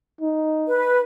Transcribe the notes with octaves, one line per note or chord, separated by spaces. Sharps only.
D#4
B4